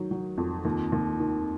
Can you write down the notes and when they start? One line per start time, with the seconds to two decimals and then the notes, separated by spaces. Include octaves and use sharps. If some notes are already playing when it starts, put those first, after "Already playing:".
Already playing: D#3 F#3
0.11 F#3
0.38 F2
0.65 D#2
0.92 D#2
1.19 D#3